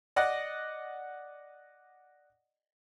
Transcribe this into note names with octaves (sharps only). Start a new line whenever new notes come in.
D5 D#5 F#5